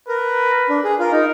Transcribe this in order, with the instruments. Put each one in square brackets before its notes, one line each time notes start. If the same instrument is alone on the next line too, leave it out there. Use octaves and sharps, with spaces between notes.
[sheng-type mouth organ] A#4 [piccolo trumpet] B4
[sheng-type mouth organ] D4
G#4
[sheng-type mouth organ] F4 [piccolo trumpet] A#4
[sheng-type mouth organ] D#4